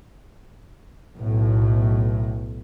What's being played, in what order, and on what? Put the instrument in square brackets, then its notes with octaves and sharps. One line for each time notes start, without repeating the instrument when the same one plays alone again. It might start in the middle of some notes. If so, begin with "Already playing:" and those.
[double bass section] B1 A2